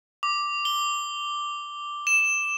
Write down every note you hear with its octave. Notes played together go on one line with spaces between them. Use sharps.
D6
G7
E7